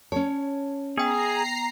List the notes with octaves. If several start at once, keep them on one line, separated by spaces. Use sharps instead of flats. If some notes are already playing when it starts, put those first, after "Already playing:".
C#4 C#5 A5
B3 G#4 G5 A#5 C7